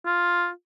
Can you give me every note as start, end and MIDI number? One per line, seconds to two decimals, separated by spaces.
0.05 0.50 65